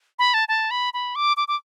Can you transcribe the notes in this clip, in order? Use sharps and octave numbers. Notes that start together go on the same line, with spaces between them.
B5
A5
A5
B5
B5
D6
D6
D6